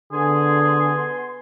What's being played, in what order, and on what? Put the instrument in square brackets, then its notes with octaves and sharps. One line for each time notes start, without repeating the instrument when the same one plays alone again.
[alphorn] D3 [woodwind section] B3 G#5 C6 [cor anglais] G#4